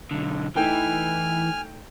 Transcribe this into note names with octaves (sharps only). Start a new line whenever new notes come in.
B1 D3
E3 A3 D#4 G5 G#5 F6